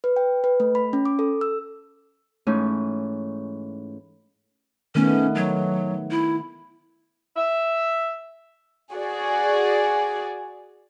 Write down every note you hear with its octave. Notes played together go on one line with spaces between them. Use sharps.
B4
G5
B4
A3
B5
C#4
D6
A4
E6
G#2 E3 A3 C#4 D#4
D#3 A3 B3 C#4
F#3
E4
E5
F#4 G#4 D5